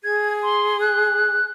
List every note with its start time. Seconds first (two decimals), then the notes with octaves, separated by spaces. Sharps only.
0.04 G#4 G#6
0.42 C6
0.81 F#6